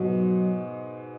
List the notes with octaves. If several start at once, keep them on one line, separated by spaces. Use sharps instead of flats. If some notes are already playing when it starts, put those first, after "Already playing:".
Already playing: G#2 B2 F#3